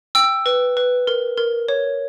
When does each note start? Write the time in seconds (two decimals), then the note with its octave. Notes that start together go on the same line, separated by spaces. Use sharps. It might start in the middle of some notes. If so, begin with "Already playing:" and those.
0.15 G5 E6
0.46 B4
0.77 B4
1.07 A#4
1.38 A#4
1.69 C#5